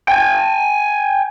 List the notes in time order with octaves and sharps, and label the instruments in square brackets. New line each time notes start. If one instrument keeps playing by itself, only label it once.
[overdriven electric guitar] G5 G#5